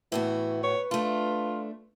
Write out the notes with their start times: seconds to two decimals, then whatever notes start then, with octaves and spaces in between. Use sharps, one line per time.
0.12 A2 E3 B3 F#4
0.63 B4 C#5
0.91 A3 D4 F4